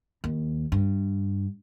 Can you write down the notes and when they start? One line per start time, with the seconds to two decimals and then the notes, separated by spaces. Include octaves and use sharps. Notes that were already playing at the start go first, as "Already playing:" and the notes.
0.24 D#2
0.72 G2